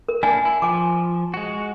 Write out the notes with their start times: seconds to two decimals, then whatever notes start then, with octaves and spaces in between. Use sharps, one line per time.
0.09 A#4
0.23 A#3 D4 E4 G#5
0.45 E4
0.62 F3 G#5 D6
1.34 G#3 F#4